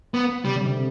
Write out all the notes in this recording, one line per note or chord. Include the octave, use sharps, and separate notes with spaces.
B3
C3 G3
D3
C3